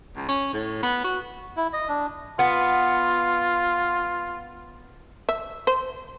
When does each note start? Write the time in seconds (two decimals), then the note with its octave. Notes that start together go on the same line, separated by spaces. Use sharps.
0.16 C#2
0.29 C#4
0.53 A2
0.83 B3
1.05 F#4
1.57 E4
1.73 D#5
1.88 D4
2.39 B3 F4
5.29 E5
5.67 C5